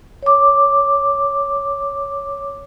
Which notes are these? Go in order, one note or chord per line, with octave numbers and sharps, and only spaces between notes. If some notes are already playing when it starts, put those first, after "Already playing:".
C#5 D6